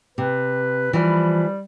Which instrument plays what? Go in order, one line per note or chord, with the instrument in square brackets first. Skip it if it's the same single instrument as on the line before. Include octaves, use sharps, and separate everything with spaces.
[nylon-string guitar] C3 [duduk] B4
[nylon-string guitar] E3 F3 [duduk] G3